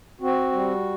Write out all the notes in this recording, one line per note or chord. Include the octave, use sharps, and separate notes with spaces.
C4 F#4
G3